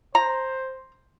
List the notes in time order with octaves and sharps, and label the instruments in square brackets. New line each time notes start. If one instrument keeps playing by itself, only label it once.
[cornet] C5 [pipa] A#5